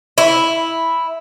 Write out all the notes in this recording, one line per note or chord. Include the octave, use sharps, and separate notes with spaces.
E4